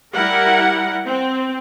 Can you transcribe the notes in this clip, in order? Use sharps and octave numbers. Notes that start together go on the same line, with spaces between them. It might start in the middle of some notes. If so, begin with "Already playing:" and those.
G3 E4 A#4 F#5
C4